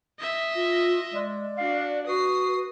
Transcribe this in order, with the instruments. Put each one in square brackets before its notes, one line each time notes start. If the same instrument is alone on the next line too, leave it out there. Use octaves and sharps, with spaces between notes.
[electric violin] D#5 E5
[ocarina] F4
[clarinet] G#3 [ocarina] D5
[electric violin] D4 F#4 [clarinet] F5
[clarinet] F#4 [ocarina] B4 [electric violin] D#6 C7